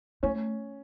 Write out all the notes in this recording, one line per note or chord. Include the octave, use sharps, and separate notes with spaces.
A3 C#4